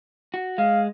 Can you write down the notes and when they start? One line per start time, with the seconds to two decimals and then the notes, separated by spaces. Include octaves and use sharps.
0.34 F#4
0.58 G#3 F5